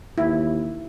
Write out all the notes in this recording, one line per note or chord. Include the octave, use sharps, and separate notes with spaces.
D#2 E4